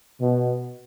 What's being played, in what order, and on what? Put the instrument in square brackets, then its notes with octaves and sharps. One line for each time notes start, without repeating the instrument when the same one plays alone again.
[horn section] B2